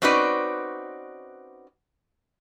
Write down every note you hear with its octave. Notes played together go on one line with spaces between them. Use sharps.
C4 C#4 D#4 F#4 B4 D5